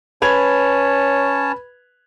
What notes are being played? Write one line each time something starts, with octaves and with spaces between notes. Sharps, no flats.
C#4 B4 C#5 A5 G#6 F7